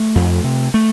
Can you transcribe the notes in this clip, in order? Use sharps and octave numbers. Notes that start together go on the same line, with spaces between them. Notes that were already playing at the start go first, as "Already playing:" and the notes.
Already playing: A3
F2
C3
A3